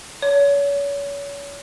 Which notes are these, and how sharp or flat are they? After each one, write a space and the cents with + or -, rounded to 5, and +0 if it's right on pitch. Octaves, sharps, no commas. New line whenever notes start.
C#5 +35